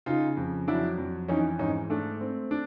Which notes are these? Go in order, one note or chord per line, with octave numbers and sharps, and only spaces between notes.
C#3 D#4 F4
F2
F#3 D4 E4
F2
E3 C#4 D#4
G#2 C#4 D#4
A3 D4
C4
D4